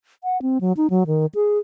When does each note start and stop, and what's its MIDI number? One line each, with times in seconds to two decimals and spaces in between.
0.24 0.40 78
0.42 0.58 60
0.61 0.73 54
0.77 0.90 63
0.90 1.04 54
1.07 1.26 51
1.35 1.58 68